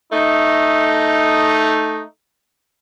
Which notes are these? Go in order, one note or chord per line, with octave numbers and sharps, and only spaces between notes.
A3 D#4